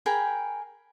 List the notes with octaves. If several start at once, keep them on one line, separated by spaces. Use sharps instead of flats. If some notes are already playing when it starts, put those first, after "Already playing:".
G#4 A#4 G5 B5